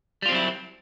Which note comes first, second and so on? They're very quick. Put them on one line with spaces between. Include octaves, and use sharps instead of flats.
G3 F4 C4 F#3 E4